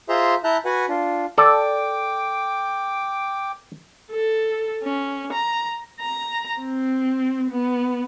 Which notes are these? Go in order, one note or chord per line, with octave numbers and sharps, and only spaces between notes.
F4 G#4 C5 E5 A#5 C6
E4 E5 A5 A#5 F#6 G6
F#4 B4 F#5 G#5
D4 F4
A4 D5 G5 D6
A4
C#4
A#5
A#5
C4
B3